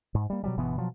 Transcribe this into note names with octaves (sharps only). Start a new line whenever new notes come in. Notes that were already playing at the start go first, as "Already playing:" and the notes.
G#2
G3 A#3
B2 F#3 G3
G1 B2 E3 B3
B2 F3 F#3